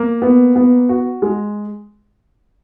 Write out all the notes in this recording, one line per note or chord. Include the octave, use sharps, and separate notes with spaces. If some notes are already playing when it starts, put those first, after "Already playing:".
Already playing: A#3
B3
B3
F#4
G#3